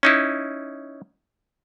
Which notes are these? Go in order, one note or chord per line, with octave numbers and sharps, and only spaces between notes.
C#4 D#4 E4